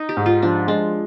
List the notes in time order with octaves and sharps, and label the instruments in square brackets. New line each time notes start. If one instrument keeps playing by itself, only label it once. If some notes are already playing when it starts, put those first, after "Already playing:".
Already playing: [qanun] D#4
G4
[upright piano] G#2
[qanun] F4
[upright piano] F3 [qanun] D4
[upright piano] G#3 [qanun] D4